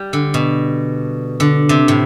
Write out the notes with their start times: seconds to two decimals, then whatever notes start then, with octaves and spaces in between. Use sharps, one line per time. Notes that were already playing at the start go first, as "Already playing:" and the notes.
Already playing: G3
0.13 D3
0.34 B2
1.40 D3
1.69 C3
1.88 A2